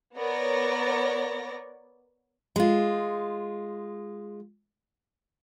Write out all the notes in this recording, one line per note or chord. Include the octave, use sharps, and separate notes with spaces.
B3 A#4 C#5 D5 A#6
G#3 F4